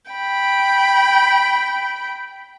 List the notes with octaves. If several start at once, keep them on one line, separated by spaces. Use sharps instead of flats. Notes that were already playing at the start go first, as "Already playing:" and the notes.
G5 B5